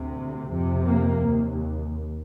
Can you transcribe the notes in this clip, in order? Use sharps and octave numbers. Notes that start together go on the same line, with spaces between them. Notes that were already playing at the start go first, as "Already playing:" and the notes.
Already playing: D2 C3
F2 C3
A#3
D#2